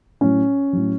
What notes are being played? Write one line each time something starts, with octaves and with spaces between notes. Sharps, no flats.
A2 F#3 C#4
A2 F#3